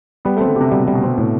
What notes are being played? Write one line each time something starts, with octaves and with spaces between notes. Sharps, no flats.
G3 B3
A3
C4
D3
C3 G4
B2 G3
G3
B2
C4
A2